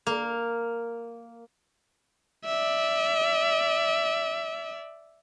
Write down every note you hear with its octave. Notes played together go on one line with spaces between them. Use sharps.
A#3
D5 E5